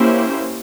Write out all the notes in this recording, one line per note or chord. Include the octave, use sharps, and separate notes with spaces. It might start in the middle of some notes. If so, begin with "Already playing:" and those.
Already playing: A#3 C#4 E4 G4 C5